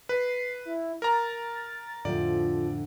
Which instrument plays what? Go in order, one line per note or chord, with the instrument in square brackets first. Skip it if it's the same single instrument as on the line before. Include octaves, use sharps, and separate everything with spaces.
[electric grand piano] B4 [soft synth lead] C7
[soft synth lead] E4
[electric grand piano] A#4 A#5 [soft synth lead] A6
[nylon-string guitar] F2 A2 D3 [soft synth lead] F3 [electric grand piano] D5